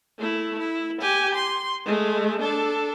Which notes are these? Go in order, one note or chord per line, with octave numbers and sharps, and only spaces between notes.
A3 E4
E4
G4 G#5
C6
G#3 A3
D4 A4